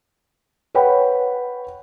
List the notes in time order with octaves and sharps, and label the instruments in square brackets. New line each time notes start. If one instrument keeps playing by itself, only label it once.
[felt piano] B4 C#5 F#5 G5 B5